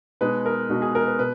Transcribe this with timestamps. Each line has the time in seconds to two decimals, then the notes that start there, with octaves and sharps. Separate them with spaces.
0.21 B2 G#3 D#4 B4
0.46 A#4
0.70 B2 G#3 D#4 F#4
0.82 G#4
0.95 A#4
1.07 B4
1.19 B2 B4